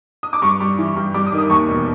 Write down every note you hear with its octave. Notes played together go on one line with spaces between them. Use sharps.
D#6
D6
G2 C#6
G3
E3
G2
G3 D6
D#6
D#3
D#6
D#2 C#6
E1